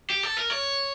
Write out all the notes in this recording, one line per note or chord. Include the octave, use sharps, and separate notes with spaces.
G4
A4
A#4
C#5